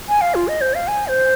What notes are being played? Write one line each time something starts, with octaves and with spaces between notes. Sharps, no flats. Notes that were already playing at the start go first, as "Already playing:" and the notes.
G#5
F5
F4
D#5
C5
F5
G#5
C5